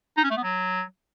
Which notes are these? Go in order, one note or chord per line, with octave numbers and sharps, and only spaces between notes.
D#4
C#4
A3
B3
F#3